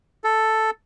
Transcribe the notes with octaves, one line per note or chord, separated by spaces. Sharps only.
A4